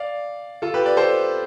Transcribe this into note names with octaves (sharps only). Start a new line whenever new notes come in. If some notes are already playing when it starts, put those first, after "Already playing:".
Already playing: D5 F5
F4 A4
G4 B4
B4 D5
A4 C5